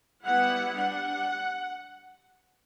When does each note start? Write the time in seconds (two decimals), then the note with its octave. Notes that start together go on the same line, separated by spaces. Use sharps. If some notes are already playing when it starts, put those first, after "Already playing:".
0.23 G3 B3 E4 F#5
0.75 G3 D4 F#5